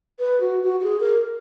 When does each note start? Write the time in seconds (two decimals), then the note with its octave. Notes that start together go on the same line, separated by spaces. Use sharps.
0.19 B4
0.41 F#4
0.63 F#4
0.80 F#4
0.84 G#4
1.00 A#4